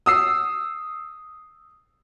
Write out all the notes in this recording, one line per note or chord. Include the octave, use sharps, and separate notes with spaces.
D#6 E6 C7